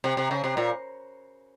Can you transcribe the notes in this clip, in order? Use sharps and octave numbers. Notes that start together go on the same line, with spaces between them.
C3
C3
C#3
C3
A#2